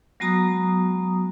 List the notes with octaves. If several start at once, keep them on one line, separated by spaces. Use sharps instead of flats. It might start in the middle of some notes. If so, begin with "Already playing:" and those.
F#3 G#3 B3 F#4 A#5 D#6